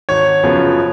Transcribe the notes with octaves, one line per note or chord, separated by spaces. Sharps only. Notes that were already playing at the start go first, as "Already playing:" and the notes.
G#1 C#5
F#2 C#3 F3 B3